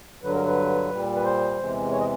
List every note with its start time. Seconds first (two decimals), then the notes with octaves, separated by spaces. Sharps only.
0.22 G2 D3 F#3 B4
0.34 A#4
0.45 B4
0.90 A#2 G3
1.15 B4
1.24 C5
1.58 E2 C3 E3 G#3
1.92 C#5
2.00 D#5